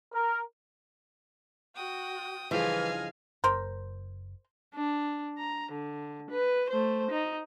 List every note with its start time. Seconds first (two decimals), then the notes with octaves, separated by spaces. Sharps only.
0.13 A#4
1.75 F#4 G5 D#6
2.51 G2 C#3 E3 F3 D#5 F5 G#5
3.44 F#1 A#4 C5
4.75 D4
5.38 A#5
5.72 D3
6.31 B4
6.70 A3 C5
7.11 D#4